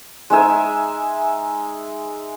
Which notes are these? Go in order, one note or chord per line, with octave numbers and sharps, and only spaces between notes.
G#3 D#4 E5 G#5